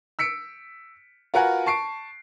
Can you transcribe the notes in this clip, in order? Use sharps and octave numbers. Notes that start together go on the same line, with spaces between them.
E6 B6 C#7 D7
F4 F#4 A#4 B4 F#5 G#5
A5 C#6 C7 D7